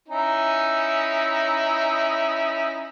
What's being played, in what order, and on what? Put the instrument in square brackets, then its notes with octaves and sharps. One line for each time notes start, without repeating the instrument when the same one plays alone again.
[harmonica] C#4 D#4 E4